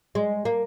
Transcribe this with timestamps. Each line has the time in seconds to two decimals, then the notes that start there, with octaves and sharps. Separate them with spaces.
0.15 G#3
0.45 A#3